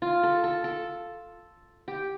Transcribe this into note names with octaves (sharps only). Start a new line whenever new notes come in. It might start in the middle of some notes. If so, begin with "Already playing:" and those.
F4
A4
A4
A4
G4